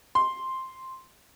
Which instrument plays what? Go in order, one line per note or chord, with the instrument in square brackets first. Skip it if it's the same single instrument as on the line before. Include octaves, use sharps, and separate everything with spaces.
[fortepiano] C6